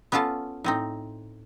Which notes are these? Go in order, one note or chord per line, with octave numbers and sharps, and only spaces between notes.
B3 C#4 F4 A4 A5
A2 C4 D#4